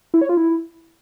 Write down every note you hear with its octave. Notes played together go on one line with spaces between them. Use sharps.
E4
C#5
F4
E4